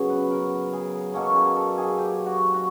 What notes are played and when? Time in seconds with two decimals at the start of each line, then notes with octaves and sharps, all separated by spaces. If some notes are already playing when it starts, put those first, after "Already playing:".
Already playing: C#3 F#3 B3
0.10 B4
0.31 A#4
0.73 G#4
1.14 B2 F#3 A#3 C#4 A4
1.36 G#4
1.56 A4
1.78 G#4
1.98 G4
2.26 F#4
2.54 F#4